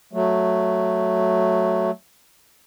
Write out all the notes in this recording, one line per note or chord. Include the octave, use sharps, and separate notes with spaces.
F#3 A3